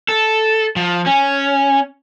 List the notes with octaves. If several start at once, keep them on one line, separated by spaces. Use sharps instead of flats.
A4
F3
C#4